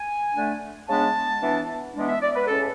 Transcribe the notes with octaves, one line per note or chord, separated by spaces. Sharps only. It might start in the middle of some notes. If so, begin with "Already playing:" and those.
Already playing: G#5
D3 A3 D4
C#3 G#3 B3 D4 A5
E3 B3 D4
E3 G#3 B3 D4
E5
D5
B4
A2 G#3 C#4 A4